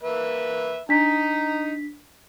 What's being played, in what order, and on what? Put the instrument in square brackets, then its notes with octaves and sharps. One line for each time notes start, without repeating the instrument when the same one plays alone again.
[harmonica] A#3 B4 E5
[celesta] D4 B6 [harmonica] D#4 A#5